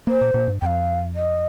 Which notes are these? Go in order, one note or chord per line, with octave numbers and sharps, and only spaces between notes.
A#3 C5
A#2
A#2
G2
F2 F5 G5
D#5